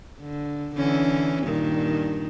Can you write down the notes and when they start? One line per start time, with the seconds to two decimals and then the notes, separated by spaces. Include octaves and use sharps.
0.21 D3
0.76 D3 E3 C#4
1.43 G2 A#2 D#3